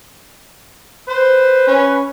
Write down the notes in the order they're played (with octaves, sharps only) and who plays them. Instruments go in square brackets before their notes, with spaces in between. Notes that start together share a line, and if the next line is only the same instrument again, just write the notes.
[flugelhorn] B4 [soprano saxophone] C5
[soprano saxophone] C#4